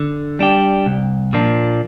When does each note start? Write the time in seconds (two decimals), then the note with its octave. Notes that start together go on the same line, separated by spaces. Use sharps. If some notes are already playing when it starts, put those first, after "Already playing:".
Already playing: D3
0.39 G3 D4 G4
0.86 C2
1.33 A#2 F3 A#3 D4